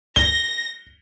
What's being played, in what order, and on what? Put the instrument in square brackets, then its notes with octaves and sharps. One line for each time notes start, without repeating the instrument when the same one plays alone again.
[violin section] A#6 [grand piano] G7